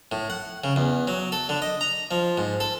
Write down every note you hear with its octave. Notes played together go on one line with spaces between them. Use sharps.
A2
F#5
C#3
E2
F#3
A4
D3
D#5
A#5
F3
G#2
A4